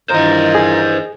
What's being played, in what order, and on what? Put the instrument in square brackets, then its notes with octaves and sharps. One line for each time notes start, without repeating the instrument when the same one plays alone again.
[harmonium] G2 D#3 E3 [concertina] D#4 F4 A#4 [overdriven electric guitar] C5 D#5
[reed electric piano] G#4